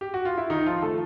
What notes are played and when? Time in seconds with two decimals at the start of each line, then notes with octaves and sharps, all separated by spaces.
0.01 G4
0.14 F#4
0.25 F4
0.38 E4
0.50 D#3 D#4
0.66 F3 F4
0.82 A3 A4